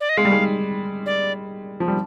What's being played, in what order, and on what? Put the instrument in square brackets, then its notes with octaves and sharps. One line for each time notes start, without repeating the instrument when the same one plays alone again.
[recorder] D5
D#5
[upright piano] G#3 [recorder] F5
[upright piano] G3
G#3
[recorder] D5
[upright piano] F3
G3